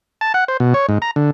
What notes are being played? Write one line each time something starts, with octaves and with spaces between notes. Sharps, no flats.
A5
F#5
C5
B2
C#5
G#2
A#5
D3